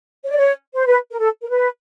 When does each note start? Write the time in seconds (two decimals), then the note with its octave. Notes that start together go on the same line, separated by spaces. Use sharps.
0.23 C#5
0.30 D5
0.37 C#5
0.75 C5
0.86 B4
1.10 A#4
1.17 A4
1.42 A#4
1.48 B4